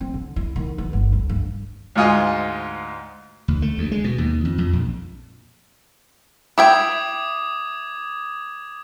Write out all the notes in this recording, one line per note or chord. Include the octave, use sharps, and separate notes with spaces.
C4
D3
E4
D#3
B3
G1
D2
G2
D2 G#2 F4 D#5 G#5
D2
A3
D2
G#3
B2
D#2
F2
F2
A#1
E4 E5 G5 D6 D#6 G#6